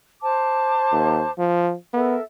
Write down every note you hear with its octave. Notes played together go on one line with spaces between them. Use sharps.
C5 A5 D6
D#2
F3
B3 A4 A#4 E5